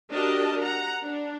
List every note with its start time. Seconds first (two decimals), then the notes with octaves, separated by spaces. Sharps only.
0.11 D4 F#4 G4 A#4 D#5 A5
0.62 F#5 A#5
1.03 D4